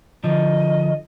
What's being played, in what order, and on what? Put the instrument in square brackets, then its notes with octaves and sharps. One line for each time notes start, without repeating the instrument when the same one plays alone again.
[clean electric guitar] D3 F3 [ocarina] D#5